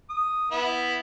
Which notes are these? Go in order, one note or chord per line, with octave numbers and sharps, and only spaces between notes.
D#6
B3 E4